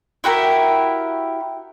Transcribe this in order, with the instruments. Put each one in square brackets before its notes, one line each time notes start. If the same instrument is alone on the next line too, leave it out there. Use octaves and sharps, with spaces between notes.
[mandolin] E4 F#4 G4 A#4